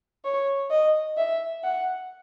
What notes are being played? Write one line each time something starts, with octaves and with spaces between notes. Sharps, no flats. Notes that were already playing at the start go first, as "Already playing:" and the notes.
C#5
D#5
E5
F#5